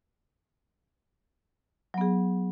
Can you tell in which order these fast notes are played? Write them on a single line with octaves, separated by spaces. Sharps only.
F#3 B3 G#4